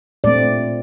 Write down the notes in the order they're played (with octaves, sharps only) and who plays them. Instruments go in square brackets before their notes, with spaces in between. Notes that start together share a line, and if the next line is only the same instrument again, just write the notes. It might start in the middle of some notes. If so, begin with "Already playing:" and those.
[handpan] A#2 A3 C4 D5